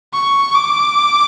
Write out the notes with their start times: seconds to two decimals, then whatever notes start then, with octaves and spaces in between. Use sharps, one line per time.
0.13 C#6
0.55 D6